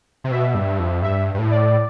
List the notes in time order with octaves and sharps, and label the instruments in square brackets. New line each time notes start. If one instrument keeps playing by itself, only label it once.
[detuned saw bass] C3
[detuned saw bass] B2 [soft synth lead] E5
[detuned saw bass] G2
F2
[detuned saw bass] G2 [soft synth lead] E5
[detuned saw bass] G2
A2
[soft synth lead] D5